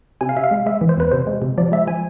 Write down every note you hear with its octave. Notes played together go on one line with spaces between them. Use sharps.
C3 G#5
F5
C3 E5
F5
G#3
G#3 E5
E3
C5
E2 B4
C3 C5
G#3
C3
F3 D5
G#3 E5
F3 G#5